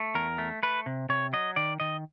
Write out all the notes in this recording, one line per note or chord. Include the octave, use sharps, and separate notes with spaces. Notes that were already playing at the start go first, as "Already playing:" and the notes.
Already playing: A3
E2 A#4
A3
A3 B4
C3
C3 C#5
F#3 D#5
D#3 D5
D#3 D#5